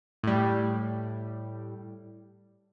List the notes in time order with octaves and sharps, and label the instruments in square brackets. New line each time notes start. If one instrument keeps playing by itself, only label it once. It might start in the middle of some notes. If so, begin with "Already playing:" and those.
[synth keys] A2 G3